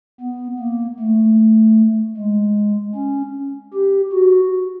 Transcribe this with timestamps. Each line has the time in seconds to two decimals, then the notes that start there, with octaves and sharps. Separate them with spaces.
0.20 B3
0.59 A#3
0.99 A3
2.17 G#3
2.95 C#4
3.74 G4
4.13 F#4